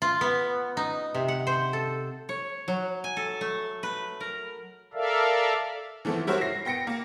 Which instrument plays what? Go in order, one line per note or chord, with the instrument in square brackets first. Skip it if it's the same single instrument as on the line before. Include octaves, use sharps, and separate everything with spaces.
[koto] F4
B3
D#4
C3
F#5
C5
A4
C#5
F#3
G#5
A4
A3
B4
A#4
[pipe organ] A4 A#4 D5 E5 F5
[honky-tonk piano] E3 F3 A3 B3 C4
G3 E4 F#4 A#4 C5 C#5
A#6 C7
B3 G5 A#6 C#7 D7
A#3